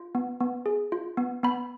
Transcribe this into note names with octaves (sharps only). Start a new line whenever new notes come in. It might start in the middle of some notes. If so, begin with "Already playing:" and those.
Already playing: F4
B3
B3
G#4
F4
B3
B3 B5